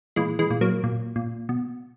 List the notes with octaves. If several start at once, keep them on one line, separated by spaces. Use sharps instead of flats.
A#2 E3 G#3
E3 G#3
A#2
F#3 A#3
A#2
A#2
B2